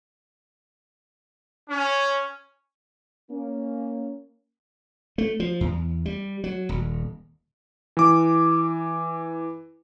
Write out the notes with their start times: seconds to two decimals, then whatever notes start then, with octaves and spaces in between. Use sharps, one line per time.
1.69 C#4
3.31 A#3 C#4
5.18 A3
5.40 F3
5.61 E2
6.06 G3
6.44 F#3
6.69 D#1
7.97 E3 D6